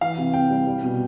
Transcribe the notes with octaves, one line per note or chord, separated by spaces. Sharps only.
E3 F5
C3
C3 G5
G3
G3
B2